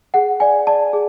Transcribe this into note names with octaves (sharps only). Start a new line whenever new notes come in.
G#4 F#5
D5 G#5
D5 A5
G#4